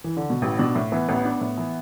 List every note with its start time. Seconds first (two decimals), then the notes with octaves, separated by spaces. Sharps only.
0.04 E3
0.17 D3
0.30 B2
0.42 A1 A2
0.59 B2 D4
0.75 A2
0.92 E3 B3
1.09 A1 B3
1.25 D4
1.41 A2
1.58 E3